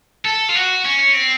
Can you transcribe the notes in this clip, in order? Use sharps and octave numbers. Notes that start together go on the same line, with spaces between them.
A4
F4
F#4
C#4
C4